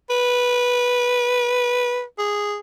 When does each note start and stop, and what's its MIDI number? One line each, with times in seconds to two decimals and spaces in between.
0.10 2.03 71
2.19 2.57 68